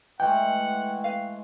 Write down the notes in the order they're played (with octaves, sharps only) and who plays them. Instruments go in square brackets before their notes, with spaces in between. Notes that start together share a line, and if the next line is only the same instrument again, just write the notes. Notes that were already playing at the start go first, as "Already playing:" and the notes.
[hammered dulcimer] E3 G#3 A3 [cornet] F#5 [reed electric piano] G5
[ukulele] B4 F5